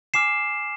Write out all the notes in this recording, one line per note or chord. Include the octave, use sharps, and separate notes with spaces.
G#5 D6 F6 C7 E7